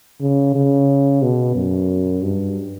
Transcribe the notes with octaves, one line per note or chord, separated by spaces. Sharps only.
C#3
C#3
B2
F#2
G2